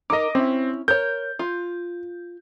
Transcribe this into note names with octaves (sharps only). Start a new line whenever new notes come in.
D#4 A#4 D#5 D6
C4 C#4 E4
A#4 C#5 G6
F4